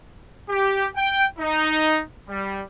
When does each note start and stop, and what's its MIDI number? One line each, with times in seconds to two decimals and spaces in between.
0.49 0.88 67
0.96 1.24 79
1.39 2.01 63
2.29 2.62 55